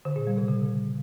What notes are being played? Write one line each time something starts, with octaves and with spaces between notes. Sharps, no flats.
D3
A#2
G3
C3
C#3